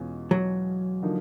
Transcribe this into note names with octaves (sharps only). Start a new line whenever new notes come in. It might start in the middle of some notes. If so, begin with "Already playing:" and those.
Already playing: E2 B2 G#3 C#4 F4
F#3
D3 F3 A#3 D#4